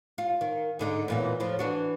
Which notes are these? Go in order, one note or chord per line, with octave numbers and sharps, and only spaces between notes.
F4
D#3
G#2 D3 D#4
E2 A#2 E3
A2 F3
E3 D4 F#4